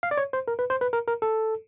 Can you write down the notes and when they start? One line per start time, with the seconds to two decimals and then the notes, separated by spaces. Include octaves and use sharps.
0.03 F5
0.11 D5
0.18 C#5
0.33 C5
0.48 A#4
0.59 B4
0.70 C5
0.81 B4
0.93 A#4
1.07 A#4
1.22 A4